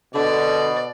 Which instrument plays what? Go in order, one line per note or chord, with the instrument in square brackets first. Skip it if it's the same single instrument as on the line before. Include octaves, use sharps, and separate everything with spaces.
[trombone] B2 [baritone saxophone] D3 [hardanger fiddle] D5